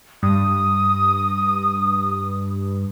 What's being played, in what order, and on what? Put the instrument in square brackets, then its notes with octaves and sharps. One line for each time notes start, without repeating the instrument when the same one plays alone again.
[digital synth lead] G2 [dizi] D#6